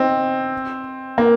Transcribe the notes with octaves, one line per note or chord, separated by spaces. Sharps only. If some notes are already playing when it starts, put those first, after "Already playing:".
Already playing: C4 D#4
A#3